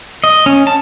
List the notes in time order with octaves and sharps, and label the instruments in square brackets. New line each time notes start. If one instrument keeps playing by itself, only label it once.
[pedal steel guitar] D#5
C#4
A5